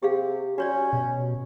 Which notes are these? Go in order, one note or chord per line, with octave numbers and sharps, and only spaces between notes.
C3 G4 G#4 F5
C#4 F#4 C#5 D5
B2